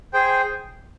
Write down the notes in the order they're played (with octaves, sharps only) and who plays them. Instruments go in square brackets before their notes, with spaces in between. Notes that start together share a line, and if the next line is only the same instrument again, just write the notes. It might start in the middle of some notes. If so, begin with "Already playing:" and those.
[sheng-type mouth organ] G#4 C5 G5